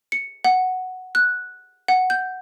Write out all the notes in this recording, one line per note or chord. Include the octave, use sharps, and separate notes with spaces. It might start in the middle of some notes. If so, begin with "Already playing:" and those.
C#7
F#5
F#6
F#5
G6